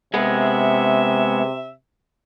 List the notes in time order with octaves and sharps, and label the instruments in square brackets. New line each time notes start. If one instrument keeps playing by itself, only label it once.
[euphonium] C3 [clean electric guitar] G#3 B3 [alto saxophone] E5